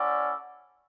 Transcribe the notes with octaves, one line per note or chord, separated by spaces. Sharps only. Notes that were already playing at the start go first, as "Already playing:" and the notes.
Already playing: C#4 E4 A4 D5 F#5